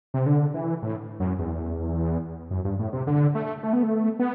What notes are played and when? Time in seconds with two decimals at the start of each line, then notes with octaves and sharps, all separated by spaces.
0.14 C3
0.26 D3
0.54 E3
0.83 A2
1.20 F#2
1.39 E2
2.51 F#2
2.65 G2
2.79 A2
2.93 C3
3.07 D3
3.35 A3
3.63 A3
3.73 B3
3.83 A3
4.19 B3